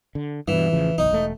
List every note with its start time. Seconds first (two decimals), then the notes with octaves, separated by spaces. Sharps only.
0.15 D3
0.48 G2 B2 E3
0.72 A1 C#3 F3
0.98 F#1 B1 D#4
1.11 E1 A3